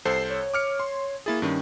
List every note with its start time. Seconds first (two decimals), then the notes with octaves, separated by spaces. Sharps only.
0.05 C2 A4 C5 C7
0.30 C#5
0.54 D6 F6 C#7
0.80 C6
1.26 A#3 E4 G#4 A6
1.42 G2 D#3 C#4